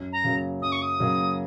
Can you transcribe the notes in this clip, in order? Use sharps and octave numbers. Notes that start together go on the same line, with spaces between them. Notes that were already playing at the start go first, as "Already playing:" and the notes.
Already playing: F#2
A#5
C#3 F#3 A#3
F#2 D#6
C#6
D#6
C#3 F#3 A#3